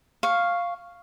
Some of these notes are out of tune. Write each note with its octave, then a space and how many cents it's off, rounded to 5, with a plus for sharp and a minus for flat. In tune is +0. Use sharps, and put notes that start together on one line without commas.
F5 +0 C#6 +0